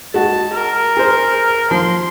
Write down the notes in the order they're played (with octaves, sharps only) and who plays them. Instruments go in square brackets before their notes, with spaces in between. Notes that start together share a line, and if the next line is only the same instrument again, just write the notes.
[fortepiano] G#3 F#4 [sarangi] A5
[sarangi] A#4
[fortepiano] G#4 C5
[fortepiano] F3 [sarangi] C6